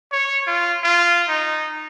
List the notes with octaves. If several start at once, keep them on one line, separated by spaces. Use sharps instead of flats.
C#5
F4
F4
D#4